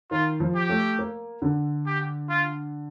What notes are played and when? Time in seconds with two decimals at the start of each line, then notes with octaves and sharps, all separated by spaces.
0.11 D#3 F4
0.40 F3
0.55 G4
0.69 A3
0.99 A#3
1.42 D3
1.86 G4
2.29 F4